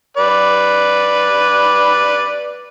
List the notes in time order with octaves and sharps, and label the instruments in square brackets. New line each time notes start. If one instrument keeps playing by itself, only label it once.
[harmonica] B4 D5